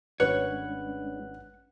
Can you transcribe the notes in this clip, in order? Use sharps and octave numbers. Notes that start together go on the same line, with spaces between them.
G#1 G#3 C#4 D4 B4 C#5 F#5 F#6